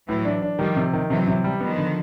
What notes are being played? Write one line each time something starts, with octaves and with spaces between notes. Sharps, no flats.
A2 E3 F#3
D4
D4
D#3 F3 G3
C3
D#3
C3 E3 F#3
C3
G3
D#3 F3 B3
D3